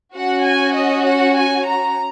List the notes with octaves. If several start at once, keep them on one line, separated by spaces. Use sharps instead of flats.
C#4 F#4 F#5
G#5
D#5
F#5
G#5
A#5